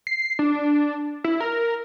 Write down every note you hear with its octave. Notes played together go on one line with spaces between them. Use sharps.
C7
D4
E4
A#4